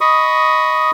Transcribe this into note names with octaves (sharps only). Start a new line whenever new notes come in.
D#5 B5 C#6 D#6